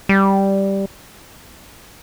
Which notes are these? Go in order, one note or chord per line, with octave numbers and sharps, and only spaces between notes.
G3